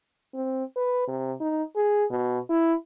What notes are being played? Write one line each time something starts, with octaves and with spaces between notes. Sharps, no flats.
C4
B4
C3
D#4
G#4
B2
E4